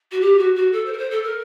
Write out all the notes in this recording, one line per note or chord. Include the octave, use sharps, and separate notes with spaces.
F#4
G4
F#4
F#4
A4
C5
A#4
C5
A4
A#4